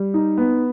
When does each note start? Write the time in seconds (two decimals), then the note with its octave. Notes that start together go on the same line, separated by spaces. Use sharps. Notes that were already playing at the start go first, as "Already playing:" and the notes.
Already playing: G3
0.14 D#4
0.38 B3